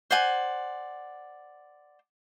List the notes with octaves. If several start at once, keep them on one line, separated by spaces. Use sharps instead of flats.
C5 D5 F#5 G#5